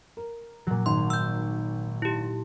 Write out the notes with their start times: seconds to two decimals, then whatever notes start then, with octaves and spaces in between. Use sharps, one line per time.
0.17 A#4
0.67 A#2 F#3
0.86 G#1 C6
1.10 E6 G6
2.02 E4 G4